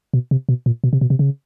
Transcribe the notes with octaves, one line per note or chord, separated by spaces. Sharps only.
B2
C3
B2
A#2
B2
C3
B2
C3
C#3